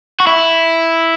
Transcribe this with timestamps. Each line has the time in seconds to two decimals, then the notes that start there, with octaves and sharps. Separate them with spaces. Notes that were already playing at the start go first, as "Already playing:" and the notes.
0.20 F#4
0.27 E4